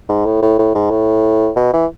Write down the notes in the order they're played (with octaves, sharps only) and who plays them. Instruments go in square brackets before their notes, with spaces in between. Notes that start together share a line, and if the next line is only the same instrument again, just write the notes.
[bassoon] G#2
A2
A2
A2
G#2
A2
B2
E3